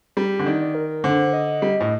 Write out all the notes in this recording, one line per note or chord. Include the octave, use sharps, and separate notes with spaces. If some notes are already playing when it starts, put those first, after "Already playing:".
G3
D3
D#3 D5
D5
A#4
D3 C5
D#5
G3
A2